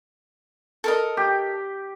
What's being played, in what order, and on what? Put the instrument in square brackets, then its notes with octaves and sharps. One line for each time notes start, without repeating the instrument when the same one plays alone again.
[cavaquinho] A4 A#4 D#5
[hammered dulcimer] G4